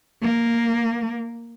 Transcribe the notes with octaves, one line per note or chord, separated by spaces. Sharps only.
A#3